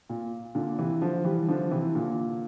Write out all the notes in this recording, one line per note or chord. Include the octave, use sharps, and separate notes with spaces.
A#2
A#2 D3
C3 E3
D3 F3
E3 G3
D3 F3
C3 E3
A#2 D3